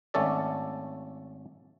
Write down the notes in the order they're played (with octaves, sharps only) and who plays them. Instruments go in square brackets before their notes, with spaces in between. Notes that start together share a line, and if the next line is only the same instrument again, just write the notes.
[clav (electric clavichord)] G#1 A3 C#4 A4 D5